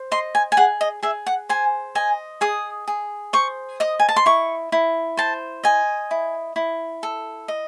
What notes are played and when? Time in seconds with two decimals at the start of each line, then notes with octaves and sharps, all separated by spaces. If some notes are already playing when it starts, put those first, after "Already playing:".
Already playing: C5
0.11 D#5 C6
0.35 G#5
0.52 G#5
0.57 G#4 F#5
0.81 D#5
1.03 G#4 E5
1.26 F#5
1.49 C5 G#5
1.95 D#5 G#5
2.41 G#4 D#6
2.88 G#4
3.33 C5 C#6
3.80 D#5 D#6
3.99 G#5
4.09 A5
4.16 C6
4.26 E4 C#6
4.72 E4
5.17 C5 A5
5.64 D#5 G#5
6.11 E4
6.56 E4
7.03 A4
7.48 D#5